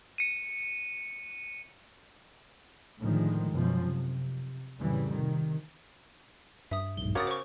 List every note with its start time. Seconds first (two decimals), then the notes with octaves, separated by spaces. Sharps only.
0.18 C#7 D#7
2.99 A2 D3 D#3 F3 G#3
3.52 F#2 B2 F3
3.83 C3
4.79 F2 A2 C#3 E3 G3
5.11 C3 D#3
6.71 G2 E5 D#6
6.97 B1 E2 G#2 G7
7.15 C#3 F#4 A#4 C#5 D6 D#6 A6
7.27 C5 C#6